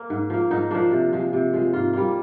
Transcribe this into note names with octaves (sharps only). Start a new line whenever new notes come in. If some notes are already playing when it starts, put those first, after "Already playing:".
Already playing: A#3
G#2
F3 A#3
G#2 D#4
F3 A#3 D4
C3
F3 G#3
C3
F3 G#3
G#2 F4
G3 A#3 F4